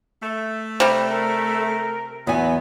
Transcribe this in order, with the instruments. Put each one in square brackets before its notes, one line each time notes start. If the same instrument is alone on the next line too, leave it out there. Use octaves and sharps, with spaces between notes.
[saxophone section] A3
[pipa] C3 G3
[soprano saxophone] A#4
[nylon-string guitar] E2 G#5 [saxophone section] F#3 B3